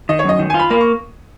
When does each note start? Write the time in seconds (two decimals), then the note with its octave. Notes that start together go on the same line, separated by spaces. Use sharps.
0.09 D#3 D#5
0.19 C#5
0.24 F#2 D#5
0.39 D#3
0.50 G#5
0.54 F4
0.59 B5
0.70 A#3 B5
0.81 C#6